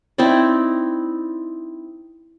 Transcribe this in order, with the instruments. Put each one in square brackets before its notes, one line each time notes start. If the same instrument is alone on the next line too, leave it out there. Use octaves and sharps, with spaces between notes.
[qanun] C4 D#4 E4 D5